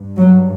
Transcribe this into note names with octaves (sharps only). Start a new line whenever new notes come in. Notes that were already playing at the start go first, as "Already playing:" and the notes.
Already playing: G2
F#3